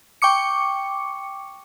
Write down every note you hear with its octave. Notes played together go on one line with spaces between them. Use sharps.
G5 C#6 D6 C#7